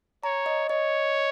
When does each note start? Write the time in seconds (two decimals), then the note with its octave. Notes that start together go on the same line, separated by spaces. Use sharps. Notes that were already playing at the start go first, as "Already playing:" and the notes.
0.23 C#5 A#5
0.46 D#5
0.69 C#5 D#5